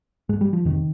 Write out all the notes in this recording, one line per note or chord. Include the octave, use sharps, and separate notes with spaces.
G#2 G#3
G3
F3
F2 C3 D#3